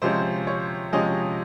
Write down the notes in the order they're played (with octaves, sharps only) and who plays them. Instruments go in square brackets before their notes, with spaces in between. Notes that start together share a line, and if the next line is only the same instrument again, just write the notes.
[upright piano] C3 F3 G#3 C#4 C5
C#5
C3 F3 G#3 C#4 D#5